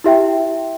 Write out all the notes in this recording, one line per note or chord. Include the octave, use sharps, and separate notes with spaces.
E4 G4 E5 G5